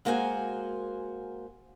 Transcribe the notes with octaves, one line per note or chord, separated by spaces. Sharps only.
G#3 A#3 F#4 C5 G5 G#5